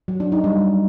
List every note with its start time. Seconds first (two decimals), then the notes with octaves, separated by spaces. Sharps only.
0.08 F#3
0.20 D4
0.32 D#4
0.44 G3